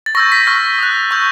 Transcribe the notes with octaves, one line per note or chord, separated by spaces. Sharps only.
A6
C#6 E6 G6 A#6
B6
C#6 F6 A#6
D#6 F#6
C#6 E6 G6